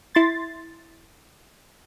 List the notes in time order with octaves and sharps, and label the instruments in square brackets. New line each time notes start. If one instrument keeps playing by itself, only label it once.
[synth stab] E4 C6 A6